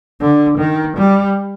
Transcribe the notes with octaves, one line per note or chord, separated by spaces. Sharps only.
D3
D#3
G3